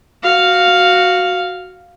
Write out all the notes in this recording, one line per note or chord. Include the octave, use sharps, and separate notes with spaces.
F#4 F5